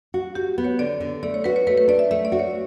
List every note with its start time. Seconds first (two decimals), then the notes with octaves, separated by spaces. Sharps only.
0.14 F#4
0.35 F#4 G4
0.58 B3
0.64 C#5
0.79 D3 D5
1.00 D3
1.23 A3 D5
1.34 C#5
1.44 F#4 B4
1.56 C#5
1.67 A3 B4
1.77 B4
1.88 D4 D5
1.99 E5
2.11 A3 E5
2.25 D5
2.32 F#4
2.39 C#5